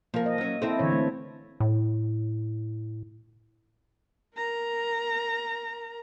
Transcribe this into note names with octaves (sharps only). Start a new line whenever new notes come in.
F3 A#3 A#4
D#5
F#3 C#4
C4 E4 A4 E5
D3 E3 C#5
A3
A2
A#4 A#5